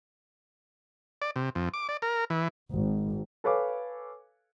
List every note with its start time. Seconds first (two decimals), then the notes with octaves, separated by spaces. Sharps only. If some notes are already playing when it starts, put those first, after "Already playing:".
1.22 D5
1.36 C3
1.55 F2
1.74 D6
1.89 D5
2.02 A#4
2.30 E3
2.72 G#1
3.44 A4 B4 C#5 F5 G#5 D6